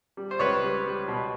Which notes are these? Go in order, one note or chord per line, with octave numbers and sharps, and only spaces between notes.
G3
C5
C#2 B4 C#5
G3
G3
B2